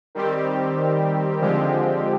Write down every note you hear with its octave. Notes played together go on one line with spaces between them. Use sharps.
D#3 G3 C4 G4
D3 F3 G#3 C4 G4